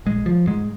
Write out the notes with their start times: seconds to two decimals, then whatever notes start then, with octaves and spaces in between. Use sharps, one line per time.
0.06 A#1 G#3
0.26 F3
0.47 G#2 G#3